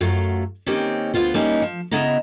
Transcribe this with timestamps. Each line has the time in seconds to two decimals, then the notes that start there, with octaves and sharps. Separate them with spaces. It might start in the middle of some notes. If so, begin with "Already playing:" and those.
0.01 F#2 F#3 A3 F4
0.66 D#3 A#3 C4 C#4 G4
1.14 D2 C3 B3 F4 C5
1.34 G3 A#3 C#4 D#4 E4
1.62 F3
1.91 C#3 B3 E4 D#5 A#5